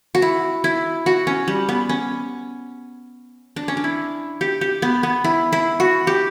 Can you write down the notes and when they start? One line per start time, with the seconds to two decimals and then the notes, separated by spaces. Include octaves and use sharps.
0.15 F#4
0.22 E4
0.64 E4
1.06 F#4
1.27 C#4
1.48 G3
1.69 B3
1.89 C#4
3.56 D4
3.68 C#4
3.77 D4
3.84 E4
4.41 G4
4.61 G4
4.82 B3
5.03 B3
5.24 E4
5.53 E4
5.80 F#4
6.07 G4